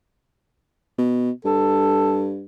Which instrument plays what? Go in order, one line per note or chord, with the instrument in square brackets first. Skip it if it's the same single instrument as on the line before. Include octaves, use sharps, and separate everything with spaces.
[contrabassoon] B2
[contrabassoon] G2 [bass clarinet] A4